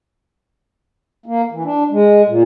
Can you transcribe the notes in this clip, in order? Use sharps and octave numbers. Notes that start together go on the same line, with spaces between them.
A#3
E3
D4
G#3
A#2